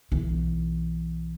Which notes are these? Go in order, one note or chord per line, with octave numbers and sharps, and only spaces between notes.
B1 E3